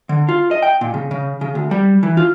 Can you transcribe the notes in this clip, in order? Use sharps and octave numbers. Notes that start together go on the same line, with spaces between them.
D3
F4
D#5
G5
A#2
C#3
C#3
C#3
D2
G3
E3
F4